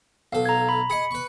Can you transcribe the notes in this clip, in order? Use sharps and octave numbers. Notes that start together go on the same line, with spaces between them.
B1 A4 F5
A#5 G#6
B5
G#4 D#5 B5 C#7
B4 C#6